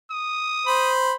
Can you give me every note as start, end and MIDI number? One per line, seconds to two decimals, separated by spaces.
0.11 0.94 87
0.67 1.13 72
0.67 1.13 83